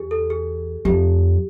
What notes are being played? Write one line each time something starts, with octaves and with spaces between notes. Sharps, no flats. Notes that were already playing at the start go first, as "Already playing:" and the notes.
Already playing: E2 G4 G#4
A4
G#4
F2 G4